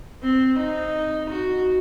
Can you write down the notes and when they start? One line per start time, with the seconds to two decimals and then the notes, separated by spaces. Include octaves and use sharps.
0.22 C4
0.58 D#4
1.29 F#4